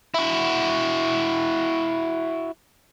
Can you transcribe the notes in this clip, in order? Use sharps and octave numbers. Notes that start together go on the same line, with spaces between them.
E4 F#4